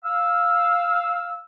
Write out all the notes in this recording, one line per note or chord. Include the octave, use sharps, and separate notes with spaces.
F5 E6